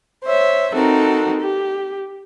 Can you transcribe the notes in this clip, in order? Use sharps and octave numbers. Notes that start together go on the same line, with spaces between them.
C5 C#5 E5
C4 D#4 F#4 A4 A#4
G4